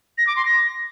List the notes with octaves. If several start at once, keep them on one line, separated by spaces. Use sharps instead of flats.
A#6
D6
C6
A#6